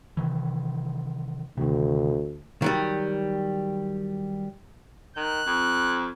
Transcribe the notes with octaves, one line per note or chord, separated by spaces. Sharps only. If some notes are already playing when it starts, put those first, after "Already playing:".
C3 D#3 E3
D2 C3 D#3
D#3 F#3 G3
D#3 F#6
F2